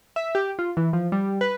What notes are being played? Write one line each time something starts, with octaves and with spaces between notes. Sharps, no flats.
E5
G4
F4
E3
F3
G3
B4